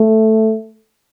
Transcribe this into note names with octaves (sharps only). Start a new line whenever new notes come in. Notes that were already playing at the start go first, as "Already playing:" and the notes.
Already playing: A3